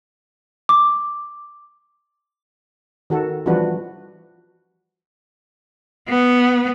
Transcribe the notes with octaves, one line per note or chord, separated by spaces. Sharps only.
D6
D#3 F#4 A4
E3 F3 G3 D4 F#4 B4
B3